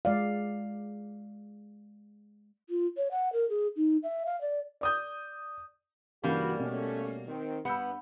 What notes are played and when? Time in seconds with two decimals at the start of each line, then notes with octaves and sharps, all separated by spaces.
0.05 G#3 D5 F5
2.70 F4
2.97 C#5
3.11 F#5
3.33 A#4
3.49 G#4
3.76 D#4
4.03 E5
4.26 F5
4.41 D5
4.81 D5 D#6 G6
6.24 G2 C#3 E3 G3 A#3 F#4
6.59 B2 A3 C#4
7.27 D#3 C4
7.65 G2 B3 E6 G6 C#7